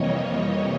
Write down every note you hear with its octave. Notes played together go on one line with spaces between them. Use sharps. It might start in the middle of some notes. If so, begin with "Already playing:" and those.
Already playing: F2 C3 E3 G3 A#3 C#5 D#5
C#5 D#5